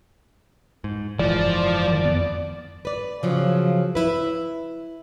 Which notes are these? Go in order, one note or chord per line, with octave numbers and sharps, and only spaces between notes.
G#2
F#1 G#2 E3 F3 D5
F2 B3
B4 D5
C#3 F3 F#3
E4 B4